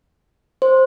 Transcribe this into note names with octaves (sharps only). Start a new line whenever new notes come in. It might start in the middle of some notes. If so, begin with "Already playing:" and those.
C5